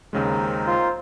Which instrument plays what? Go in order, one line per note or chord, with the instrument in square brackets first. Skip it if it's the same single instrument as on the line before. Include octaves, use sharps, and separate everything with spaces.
[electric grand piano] D#2 C#3 G#3 [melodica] C4 D#4 A#4
[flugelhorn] F4 [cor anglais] C5